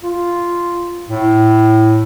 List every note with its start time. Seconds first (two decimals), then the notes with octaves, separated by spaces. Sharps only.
0.03 F4
1.10 A2